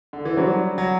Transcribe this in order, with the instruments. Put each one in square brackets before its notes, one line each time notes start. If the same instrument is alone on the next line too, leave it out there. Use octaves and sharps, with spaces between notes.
[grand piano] D3
E3
[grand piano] F#3 [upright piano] G3 D4 F#4 C5
[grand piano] F#3